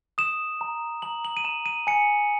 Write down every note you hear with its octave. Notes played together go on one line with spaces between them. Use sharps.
D#6 E7
A#5
A#5 F#7
F#7
D#7
A#5 E7
D#7
G#5 C#7